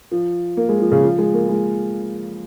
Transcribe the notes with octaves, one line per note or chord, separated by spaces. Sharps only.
F3
A#3
G#3
F3
C#3
F3
G#3
A#3
G#3